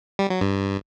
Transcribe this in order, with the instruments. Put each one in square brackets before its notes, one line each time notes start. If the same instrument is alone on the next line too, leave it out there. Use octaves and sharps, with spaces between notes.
[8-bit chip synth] G3
F#3
G2